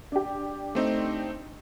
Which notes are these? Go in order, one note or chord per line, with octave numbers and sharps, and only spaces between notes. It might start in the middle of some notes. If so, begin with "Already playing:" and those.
D4 G4
A3 C4 D#4